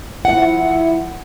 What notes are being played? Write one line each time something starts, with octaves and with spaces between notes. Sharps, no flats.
F3 E4 F#5